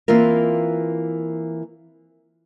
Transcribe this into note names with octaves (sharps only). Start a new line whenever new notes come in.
E3 A#3 C4 F4 A#4